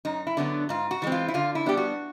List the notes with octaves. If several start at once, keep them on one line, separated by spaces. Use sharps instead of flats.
F#2 D#4
E4
D3 F#3 B3 D4
G#2 F4
F#4
E3 G#3 C4
F4
E4
D3 F4
E4
G3 B3 D4 G4
F#4